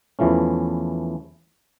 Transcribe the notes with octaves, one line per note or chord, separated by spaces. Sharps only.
E2 E3 F3 A3 C#4